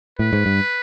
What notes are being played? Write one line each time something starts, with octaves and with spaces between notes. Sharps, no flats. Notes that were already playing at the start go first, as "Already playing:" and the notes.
A2 B4
G#2
G2